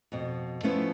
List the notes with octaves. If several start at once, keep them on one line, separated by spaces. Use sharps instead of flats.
F2 B2
F3 A3 B3 C#4 E4 F4